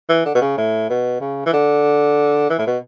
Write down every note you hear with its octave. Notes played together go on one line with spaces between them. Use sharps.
E3
D3
B2
C#3
A2
B2
C#3
E3
D3
E3
A2
B2